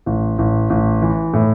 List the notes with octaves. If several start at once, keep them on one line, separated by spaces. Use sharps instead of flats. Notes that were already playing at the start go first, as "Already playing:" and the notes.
A1
A1
A1
E3
A2